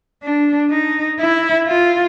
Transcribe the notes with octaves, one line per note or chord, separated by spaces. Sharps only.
D4
D#4
E4
F4